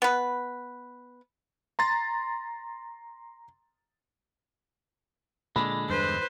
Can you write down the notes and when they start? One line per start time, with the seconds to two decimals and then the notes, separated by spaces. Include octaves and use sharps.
0.02 B3 B4
1.79 A#5 C6 A6
5.56 A#2 D3 G#3 A#3 B5
5.89 E2 G2 B4 C5